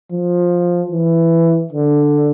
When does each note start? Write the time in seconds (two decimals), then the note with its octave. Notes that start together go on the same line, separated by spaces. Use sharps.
0.12 F3
0.92 E3
1.73 D3